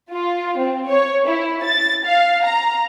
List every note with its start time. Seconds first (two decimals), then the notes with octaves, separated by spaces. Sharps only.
0.11 F4
0.58 C4
0.88 C#5
1.27 E4
1.65 A6
2.06 F5
2.45 A#5